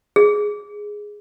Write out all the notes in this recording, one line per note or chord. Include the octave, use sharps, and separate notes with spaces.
G#4